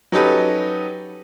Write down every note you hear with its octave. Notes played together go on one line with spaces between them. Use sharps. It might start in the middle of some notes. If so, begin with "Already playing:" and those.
F#3 C#4 D#4 G4 A4 B4